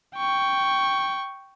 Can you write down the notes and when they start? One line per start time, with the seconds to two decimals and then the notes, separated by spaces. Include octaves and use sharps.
0.17 G5 C#6